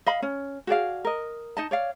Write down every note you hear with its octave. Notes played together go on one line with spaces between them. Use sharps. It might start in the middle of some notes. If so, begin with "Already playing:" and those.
D#5 F5 B5
C#4
F#4 G#4 D5 F5
A#4 D#5
D#4 D#5 A5
C#5 D5 F5